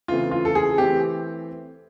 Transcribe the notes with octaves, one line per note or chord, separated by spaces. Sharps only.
C#3 E3 A3 C4 F4
F4
A4
G#4
E3 A3 C4 G4